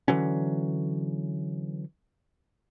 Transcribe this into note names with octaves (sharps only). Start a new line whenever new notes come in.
D3 E3 F#3 C#4